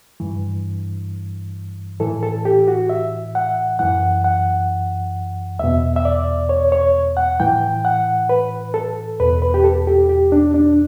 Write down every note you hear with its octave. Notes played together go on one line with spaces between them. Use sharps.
G2 E3
A2 E3 A4
A4
G4
F#4
E5
F#5
F#2 E3 F#5
F#5
E2 B2 E5
E5
D5
C#5
C#5
F#5
A2 E3 G5
F#5
B4
A4
E2 B2 B4
B4
G4
A4
G4
G4
D4
D4